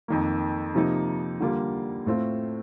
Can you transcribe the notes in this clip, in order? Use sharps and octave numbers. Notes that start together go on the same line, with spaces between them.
F2 D#3 A#3
C3 F3 A#3 D#4
D3 G3 A#3 F4
A2 A3 C4 F4